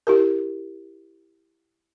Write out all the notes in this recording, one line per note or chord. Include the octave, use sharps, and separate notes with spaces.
E4 G4 A#4